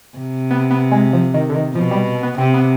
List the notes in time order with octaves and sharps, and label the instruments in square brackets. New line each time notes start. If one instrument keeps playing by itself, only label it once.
[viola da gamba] C3
[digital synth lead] B3
B3
G#3
F3
D#3
D3
D#3
[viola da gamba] B2 [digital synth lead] F3
[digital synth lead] G3
B3
[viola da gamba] C3 [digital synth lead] C4
[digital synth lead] B3